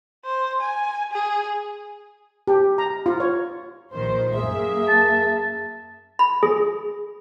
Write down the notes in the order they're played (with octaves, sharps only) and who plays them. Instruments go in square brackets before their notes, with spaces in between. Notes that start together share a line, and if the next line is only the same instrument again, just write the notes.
[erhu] C5
G#5
G#4
[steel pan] G4
A#5
F4
C#5
[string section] A#1 D#3 C5
[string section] F#2 A#3 E5 [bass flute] G#4
[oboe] A5
[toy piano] B5
[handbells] G#4